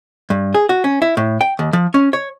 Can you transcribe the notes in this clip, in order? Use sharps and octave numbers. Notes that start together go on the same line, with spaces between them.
G2
G#4
F#4
C#4
E4
A2
G5
D#2
F3
C#4
C#5